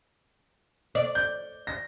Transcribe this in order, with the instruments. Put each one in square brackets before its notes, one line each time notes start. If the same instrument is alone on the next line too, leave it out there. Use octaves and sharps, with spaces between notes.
[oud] D5
[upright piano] G6
A#6